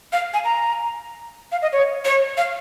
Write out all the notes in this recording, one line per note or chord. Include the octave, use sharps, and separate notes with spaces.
F5
G#5
A#5
F5
D#5
C#5
C#5
F5